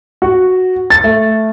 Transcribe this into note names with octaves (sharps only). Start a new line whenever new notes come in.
F#4
A6
A3